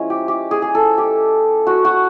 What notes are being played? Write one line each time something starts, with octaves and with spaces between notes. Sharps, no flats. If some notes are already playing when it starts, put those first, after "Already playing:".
Already playing: F3 G#3 C#4 E4
G4
G4
G#4
G#4
A4
G4
F#4
F#4